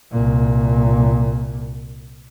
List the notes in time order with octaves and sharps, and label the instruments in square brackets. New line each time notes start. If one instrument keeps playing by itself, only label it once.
[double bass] C2 A#2